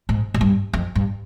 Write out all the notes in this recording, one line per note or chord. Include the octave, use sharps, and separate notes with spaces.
G#2
G#2
G2
F2
G2